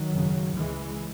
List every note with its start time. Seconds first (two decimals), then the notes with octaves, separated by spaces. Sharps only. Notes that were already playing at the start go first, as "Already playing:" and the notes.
Already playing: D#3 F#3
0.10 G#1 F#2 C#3
0.54 C#2 C#3 E3 G#3